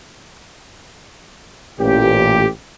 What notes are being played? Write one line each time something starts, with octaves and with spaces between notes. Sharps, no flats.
A1 A#2 G4